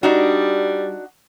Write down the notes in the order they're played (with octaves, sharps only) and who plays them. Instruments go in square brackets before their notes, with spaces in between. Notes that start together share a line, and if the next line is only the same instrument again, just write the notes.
[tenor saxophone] G3 [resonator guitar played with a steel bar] D4 D#4 F#4